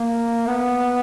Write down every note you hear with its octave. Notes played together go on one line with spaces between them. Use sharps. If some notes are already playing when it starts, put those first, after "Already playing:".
Already playing: A#3
B3